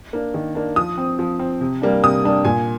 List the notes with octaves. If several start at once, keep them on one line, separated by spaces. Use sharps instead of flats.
A#3 D4
D#3
A#3 D4
F3 D#6
C4
F3
C4
C3
G3 A#3 D4
C3 D#6
G3 A#3 D4
A#2 G#5